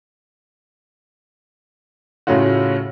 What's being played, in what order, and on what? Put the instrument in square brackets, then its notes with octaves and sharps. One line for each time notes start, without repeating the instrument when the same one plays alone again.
[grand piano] A2 C#3 A3 C#4 F4 F#4